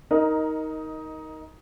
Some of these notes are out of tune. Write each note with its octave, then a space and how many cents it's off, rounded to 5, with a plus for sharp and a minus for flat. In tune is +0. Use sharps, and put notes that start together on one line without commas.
D#4 +15 A#4 +0 D#5 +0